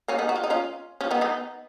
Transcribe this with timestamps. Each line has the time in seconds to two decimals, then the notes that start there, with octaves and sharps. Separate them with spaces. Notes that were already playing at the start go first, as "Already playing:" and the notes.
0.08 A#3 C#4
0.18 B3 D#4
0.29 F#4
0.36 F4
0.44 D#4
0.50 C#4 F4
1.01 C#4 F4
1.11 B3 D#4
1.21 B3 D#4